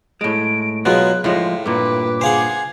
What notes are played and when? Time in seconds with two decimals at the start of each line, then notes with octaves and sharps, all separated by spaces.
0.21 A2 G#3 D7
0.85 B2 F#3 G#3 F4 F#6
1.24 A2 F3 G#3 F5
1.66 G2 A#2 B4 D6
2.21 G#4 C5 F5 F#5